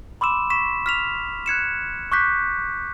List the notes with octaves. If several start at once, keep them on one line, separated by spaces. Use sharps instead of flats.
B5 C6 D6 E6 E7
C#6 B6 E7
F6 B6 F7
F#6 G#6 C#7 E7
C#6 D6 F#6 G6 B6